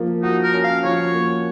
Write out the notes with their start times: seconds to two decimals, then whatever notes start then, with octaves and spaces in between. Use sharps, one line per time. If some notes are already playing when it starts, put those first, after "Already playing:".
Already playing: F3 A#3
0.22 D#4 F#4
0.43 A#4
0.54 C#4
0.64 F5
0.84 F3 C#5
1.14 A#3